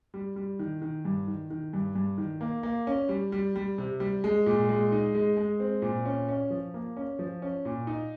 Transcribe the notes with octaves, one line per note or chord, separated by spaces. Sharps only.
G3
G3
D#3
D#3
G2
D#3
D#3
G2
G2
D#3
A#3
A#3
C#4
G3
G3
G3
C3
G3
G#3
A#2
G#3
D#4
G#3
G#3
C4
A#2
C#4
C#4
F3
A#3
C#4
F3
C#4
A#2
D#4